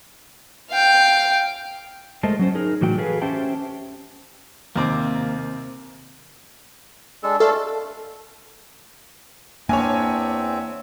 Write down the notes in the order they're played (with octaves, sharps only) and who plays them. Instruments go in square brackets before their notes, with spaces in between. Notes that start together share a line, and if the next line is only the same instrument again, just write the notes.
[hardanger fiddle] F5 G5
[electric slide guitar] G#3 A3 A#4 C5 D#5 A5
F#3 C#4 C5
D#4 G#4 A#4
A2 E3 F#3 F#4 G5
F#4 G#4 A4 B4 F5 G#5
C#4 G4 C5 E5 G5 A5
[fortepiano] D#2 C4 D6 [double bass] C3 [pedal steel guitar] A#3
[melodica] G#3 D4 A4
[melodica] A3 D4 F5 [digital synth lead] A4
[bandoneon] E2 C4 E5 [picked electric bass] A#3 [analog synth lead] D4 [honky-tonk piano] C#5 G#5